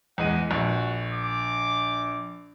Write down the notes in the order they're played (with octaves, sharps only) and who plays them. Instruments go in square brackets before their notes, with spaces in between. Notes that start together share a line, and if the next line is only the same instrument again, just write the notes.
[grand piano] E2 G#3 D#7 [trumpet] F#5
[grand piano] A#1 [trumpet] F#4
[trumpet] D6